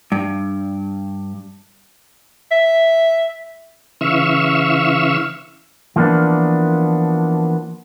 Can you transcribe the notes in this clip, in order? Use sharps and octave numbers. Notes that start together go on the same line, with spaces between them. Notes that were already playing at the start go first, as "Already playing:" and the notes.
G2
E5
C#3 E3 E5 F5 C#6 E6
E3 F3 A#3 B3 D4